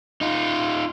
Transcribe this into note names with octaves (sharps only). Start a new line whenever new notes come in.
D#4 F4